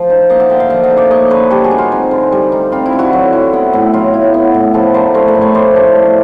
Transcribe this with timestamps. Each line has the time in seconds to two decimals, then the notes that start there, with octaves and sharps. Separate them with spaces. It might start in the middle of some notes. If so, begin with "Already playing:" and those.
Already playing: F3
0.10 D#4
0.30 A#3 D#5 F5
0.40 E5 F#5
0.49 D3 F5 G5
0.60 F5 G5
0.70 F3 E5 F#5
0.84 D#5 F5
0.90 D#4
0.97 D5 E5
1.11 A#3 C#5 D#5
1.30 D3 B4 C#5
1.50 G3 G4 A4
1.64 F#4 G#4
1.71 D#4
1.78 F4
1.92 C4
2.11 D3
2.32 G3
2.52 D#4
2.72 C4 F4
2.86 E4
2.93 D3
2.99 E4 F#4
3.13 F#3
3.33 E4
3.53 B3
3.73 A2
3.94 F#3 F4
4.14 E4
4.34 B3
4.54 A2
4.74 F3 A4 B4
4.94 D4 A#4 C5
5.14 A3 A#4 C5
5.28 A4 B4
5.35 A2
5.41 B4 C#5
5.55 F3 C5 D5
5.76 D4
5.96 A3